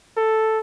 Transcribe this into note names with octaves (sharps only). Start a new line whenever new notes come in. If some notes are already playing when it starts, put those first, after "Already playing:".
A4